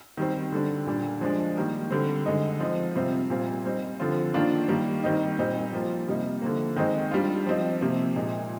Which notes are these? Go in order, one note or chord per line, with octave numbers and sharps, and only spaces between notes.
D#3 G3 C4
D3 G3 D4
A#2 G3 D4
F3 G#3 D4
D#3 G3 A#3
D3 G3 C4
D3 G#3 D#4
F3 C4 D#4
C3 G3 C4 F4
A#2 G3 C4 F4
G3 C4 D#4
D3 F3 C4 F4
D#3 A#3 D4 F4
D#3 G3 A#3
D#3 G3 C4 D#4
A#2 G3 C4 D#4
F3 A#3 F4
C3 G3 A#3 D#4
D3 F3 A#3
D#3 G#3 C4 D#4
G3 D4 F4
F3 C4 D#4
C3 F3 A#3
A#2 G#3 D#4